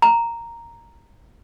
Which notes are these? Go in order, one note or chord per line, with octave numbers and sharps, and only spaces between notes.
A#5